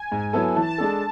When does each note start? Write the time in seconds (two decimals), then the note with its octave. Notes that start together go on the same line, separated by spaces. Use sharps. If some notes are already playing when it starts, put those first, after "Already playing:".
Already playing: G#5
0.12 G#2
0.33 F#3 B3 E4 A4
0.51 G#5
0.56 E3 A5
0.78 G#3 D4 A4